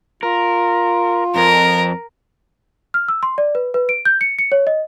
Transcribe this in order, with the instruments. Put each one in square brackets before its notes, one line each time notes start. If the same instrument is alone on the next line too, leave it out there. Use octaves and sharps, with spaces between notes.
[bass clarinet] F4 [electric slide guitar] A#4
[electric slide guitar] F2 [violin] A#4
[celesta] F6
E6
C6
D5
B4
B4
D7
G6
C#7
C#7
C#5
D#5